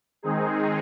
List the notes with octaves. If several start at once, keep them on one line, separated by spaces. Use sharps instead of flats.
D#3 G#3 C4 D#4 G#4